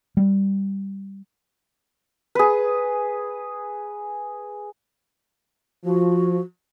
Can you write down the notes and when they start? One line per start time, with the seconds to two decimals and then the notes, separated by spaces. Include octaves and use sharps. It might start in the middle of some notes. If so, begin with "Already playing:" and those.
0.17 G3
2.35 G#4 B4
5.85 F3 F#4